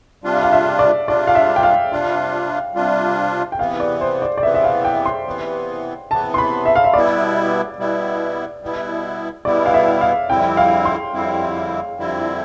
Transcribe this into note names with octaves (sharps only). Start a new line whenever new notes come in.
C3 G3 D4 F4
F5
E5
D5
C3 G3 D4 F4 D5
F5
E5
G5
F5
C3 G3 D4 F4
C3 G3 D4 F4
G5
C3 E3 B3 F5
D5
C5
D5
D5
C3 E3 B3 E5
E5
F5
G5
C6
C3 E3 B3
C3 E3 B3 A5
C6
B5
E5
F5
E5
B2 G3 B3 E4 D5
B2 G3 B3 E4
B2 G3 B3 E4
B2 G3 B3 E4 D5
F5
E5
F5
F2 D3 G3 C4 E4 G5
F5
C6
F2 D3 G3 C4 E4
F2 D3 G3 C4 E4